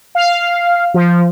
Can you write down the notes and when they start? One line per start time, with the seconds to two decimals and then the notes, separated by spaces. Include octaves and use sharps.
0.15 F5
0.94 F3